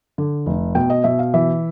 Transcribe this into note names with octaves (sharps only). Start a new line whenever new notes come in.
D3
F1
B2 G5
D#5
B2 E5
F5
E3 E5